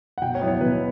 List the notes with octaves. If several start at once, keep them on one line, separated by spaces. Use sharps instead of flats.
F#5
B2 G5
C#5
F#3 B3 E4
C#5
B2 B4